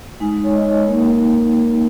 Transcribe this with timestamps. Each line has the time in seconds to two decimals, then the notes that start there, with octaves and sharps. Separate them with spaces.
0.20 G#3 D#4 G#5
0.44 C#5
0.54 D#5
0.87 A#3 A#4
0.92 D#4